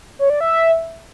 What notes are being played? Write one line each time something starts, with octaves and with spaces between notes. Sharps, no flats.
C#5
D5
E5